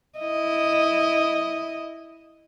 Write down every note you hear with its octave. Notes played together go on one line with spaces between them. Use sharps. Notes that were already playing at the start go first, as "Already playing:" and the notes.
E4 D#5